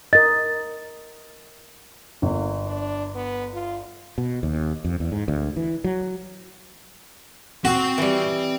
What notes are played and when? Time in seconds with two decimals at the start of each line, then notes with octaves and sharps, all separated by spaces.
0.13 A#4 D#5 A6
2.22 G1 A#3
2.66 D4
3.15 B3
3.54 F4
4.18 B2
4.43 D#2
4.85 F2
5.00 E2
5.12 G#2
5.28 D2
5.57 E3
5.84 F#3
7.65 C4 F#4 G5
7.98 E3 G3